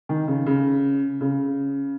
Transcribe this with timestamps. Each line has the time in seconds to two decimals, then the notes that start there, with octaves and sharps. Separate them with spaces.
0.09 D#3
0.28 C#3
0.46 C#3
1.21 C#3